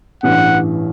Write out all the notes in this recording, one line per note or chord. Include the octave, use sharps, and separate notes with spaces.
A1 G2 E3 F#5